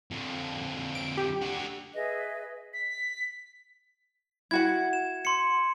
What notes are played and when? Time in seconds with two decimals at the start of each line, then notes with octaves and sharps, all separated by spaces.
0.11 F2 D3
0.95 D7
1.17 G4
1.42 D3 F#4
1.95 G#4 B4 D#5 E5
2.73 B6
4.51 E4 F#4 F#5 G#6
4.93 E7
5.25 C6 C#7